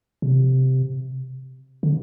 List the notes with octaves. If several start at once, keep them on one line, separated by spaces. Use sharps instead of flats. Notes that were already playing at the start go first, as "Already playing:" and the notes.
C3
D3